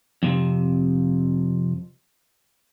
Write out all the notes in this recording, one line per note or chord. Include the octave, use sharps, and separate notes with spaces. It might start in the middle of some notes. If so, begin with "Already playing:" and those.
F2 C3